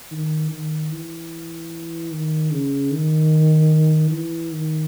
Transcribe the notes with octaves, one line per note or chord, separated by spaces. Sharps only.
D#3
D#3
E3
D#3
C#3
D#3
E3
D#3